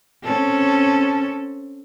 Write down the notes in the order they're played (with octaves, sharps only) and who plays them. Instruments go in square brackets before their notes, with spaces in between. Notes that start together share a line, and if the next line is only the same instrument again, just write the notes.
[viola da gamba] C4 C#4 A4